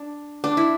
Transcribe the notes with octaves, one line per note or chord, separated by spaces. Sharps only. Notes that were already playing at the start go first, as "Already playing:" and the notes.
Already playing: D4
D4
E4